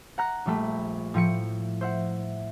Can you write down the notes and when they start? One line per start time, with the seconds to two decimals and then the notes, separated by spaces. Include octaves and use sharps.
0.18 F#5 A#5 F#6
0.46 A#1 G3 A3 B5
1.14 A2 F3 E4 C#7
1.81 C5 E5 F#5